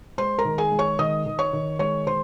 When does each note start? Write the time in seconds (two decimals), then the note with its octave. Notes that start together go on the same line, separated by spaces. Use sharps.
0.18 G#3 C5 C6
0.39 A#4 A#5
0.45 D#3
0.58 G#4 G#5
0.72 G#3
0.79 C#5 C#6
0.99 D#3 D#5 D#6
1.26 D#3
1.39 C#5 C#6
1.53 D#3
1.79 G#3 C#5 C#6
2.07 D#3 C5 C6